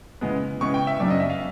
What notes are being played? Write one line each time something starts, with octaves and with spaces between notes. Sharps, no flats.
C#3 E3 G#3 B3
C#3 E3 G#3 B3 C#6
G5
E5
F#2 C#3 F#3 B3 D4 D5
D#5
E5
F5